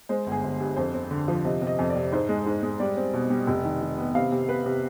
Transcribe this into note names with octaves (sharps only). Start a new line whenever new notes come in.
G#3 C5
G1
G#4
G1
G2
F2 C5
C4
D3
F3
C3 D#5
C3
D#5
F2
D5
C3
G#2 C5
G#3
G#2
G#3
G3 D5
C4
B2
G3
F1
D#3
D#3
B3
C3 F5
C3
B3 B4
C3